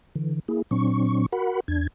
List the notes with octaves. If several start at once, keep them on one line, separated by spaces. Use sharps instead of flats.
D3 E3
A#3 E4 G#4
A#2 F#3 C4 D4 C#6
F#4 A#4 F#5 B5
E2 D4 G#6